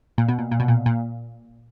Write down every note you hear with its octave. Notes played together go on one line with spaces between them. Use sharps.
A#2
B2
A#2
A#2
B2
A#2
A#2